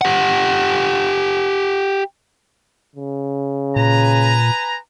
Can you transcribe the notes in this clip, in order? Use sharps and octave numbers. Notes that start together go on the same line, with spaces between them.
G4 F#5
C#3
A#2 B4 G#5 A#5